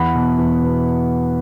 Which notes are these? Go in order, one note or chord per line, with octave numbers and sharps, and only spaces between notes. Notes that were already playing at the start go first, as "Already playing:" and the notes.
Already playing: E2 F#5 B5
B2 B3
E2
B2 B3